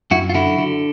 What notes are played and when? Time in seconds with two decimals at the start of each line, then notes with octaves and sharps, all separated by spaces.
0.11 F#2 E4 F#4
0.29 F4
0.34 D3 E4 F#4
0.58 D3